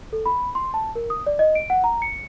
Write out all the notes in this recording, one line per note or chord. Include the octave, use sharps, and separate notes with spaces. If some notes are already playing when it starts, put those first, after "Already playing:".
A4
B5
C6
A5
A#4
D#6
D5
D#5
D7
F#5
A#5
C#7